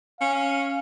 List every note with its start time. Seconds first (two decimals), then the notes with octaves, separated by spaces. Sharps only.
0.21 C#4 F5